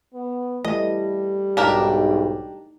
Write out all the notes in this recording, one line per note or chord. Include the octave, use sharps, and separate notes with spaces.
B3
E3 G3 A3 D#5
B1 G#2 D4 D#4 G4 A#4